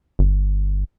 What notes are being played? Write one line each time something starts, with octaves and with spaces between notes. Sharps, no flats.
G1